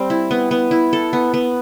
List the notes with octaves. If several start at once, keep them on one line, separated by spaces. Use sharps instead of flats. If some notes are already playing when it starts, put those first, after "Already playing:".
Already playing: G3 C4
E4
B3
B3
E4
A4
B3
B3